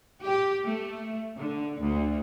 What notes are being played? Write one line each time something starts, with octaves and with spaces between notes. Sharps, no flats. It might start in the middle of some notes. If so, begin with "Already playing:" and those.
G4
A3
D3
D2